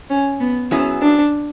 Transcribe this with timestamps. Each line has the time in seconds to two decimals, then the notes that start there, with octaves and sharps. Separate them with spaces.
0.10 C#4
0.40 B3
0.71 F#3 B3 C#4 E4 G#4
1.02 D4